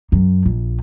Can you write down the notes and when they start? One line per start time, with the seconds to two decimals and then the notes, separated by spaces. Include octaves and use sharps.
0.12 F#2
0.45 A#1